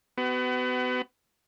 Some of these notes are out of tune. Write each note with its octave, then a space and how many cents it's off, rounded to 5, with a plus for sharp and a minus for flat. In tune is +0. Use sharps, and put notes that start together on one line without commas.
B3 +30 F#4 +40